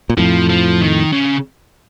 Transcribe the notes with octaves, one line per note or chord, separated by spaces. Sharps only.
A#2
F2 A2 F3
F3
D#3
C#3